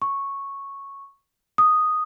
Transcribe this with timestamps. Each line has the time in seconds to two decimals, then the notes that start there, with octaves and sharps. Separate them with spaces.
0.02 C#6
1.58 D#6